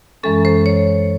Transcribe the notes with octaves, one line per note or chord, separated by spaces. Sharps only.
F#2 E3 G#3 C#4 A4
C5
C#5